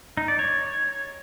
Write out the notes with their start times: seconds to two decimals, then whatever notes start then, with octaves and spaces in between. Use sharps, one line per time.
0.17 D#4
0.28 D5
0.39 C#5